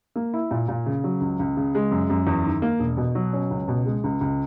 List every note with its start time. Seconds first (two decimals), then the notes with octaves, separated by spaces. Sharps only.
0.16 A#3
0.34 E4
0.51 A#2
0.68 A#2
0.86 C#3
1.04 F#3
1.21 C#2
1.39 C#2
1.57 C#3
1.75 G#3
1.91 F#2
2.10 F#2
2.27 E2
2.44 D#3
2.62 A#3
2.79 E1
2.97 B2
3.15 F#3
3.33 C#4
3.51 C#2
3.68 B2
3.86 G#3
4.04 C#2
4.21 C#2